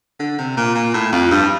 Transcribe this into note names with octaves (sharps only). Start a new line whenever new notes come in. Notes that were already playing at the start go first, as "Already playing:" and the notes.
D3
C3
A#2
A#2
A2
F2
G2